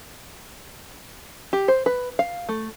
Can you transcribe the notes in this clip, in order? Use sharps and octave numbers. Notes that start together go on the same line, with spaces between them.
G4
C5
B4
F5
A3